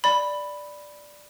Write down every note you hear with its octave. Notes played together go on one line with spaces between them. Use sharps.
D5 B5